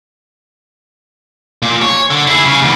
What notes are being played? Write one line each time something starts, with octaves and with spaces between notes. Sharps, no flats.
A#2
C#5
D3
E4 G#4
C#3
D2 E3